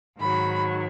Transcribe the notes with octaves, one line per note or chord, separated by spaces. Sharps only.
G#2 D#3 F#3 B5